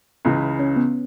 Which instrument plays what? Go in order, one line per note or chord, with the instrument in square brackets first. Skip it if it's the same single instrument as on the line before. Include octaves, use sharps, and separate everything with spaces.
[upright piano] C#2 C#3 E3
[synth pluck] C#4
B3